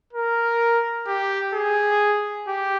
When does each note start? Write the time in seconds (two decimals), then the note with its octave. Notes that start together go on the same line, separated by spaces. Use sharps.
0.13 A#4
1.07 G4
1.54 G#4
2.47 G4